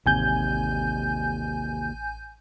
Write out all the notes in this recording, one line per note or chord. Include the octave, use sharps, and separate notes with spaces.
A1 D#2 C3 G#5 G6